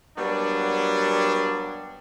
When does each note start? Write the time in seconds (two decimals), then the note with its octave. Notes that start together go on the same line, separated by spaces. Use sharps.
0.17 F#3 G3 A#3 B3 D4